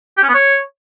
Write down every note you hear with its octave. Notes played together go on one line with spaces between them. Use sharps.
G4
C#4
B3
C#5